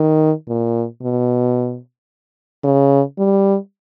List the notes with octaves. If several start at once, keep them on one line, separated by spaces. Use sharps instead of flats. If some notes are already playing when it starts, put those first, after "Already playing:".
Already playing: D#3
A#2
B2
C#3
G3